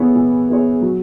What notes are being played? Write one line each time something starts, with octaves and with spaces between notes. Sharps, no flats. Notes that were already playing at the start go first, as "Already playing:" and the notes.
Already playing: E3 B3 E4 G#4 C#5
E3
B3 E4 G#4 C#5
F#3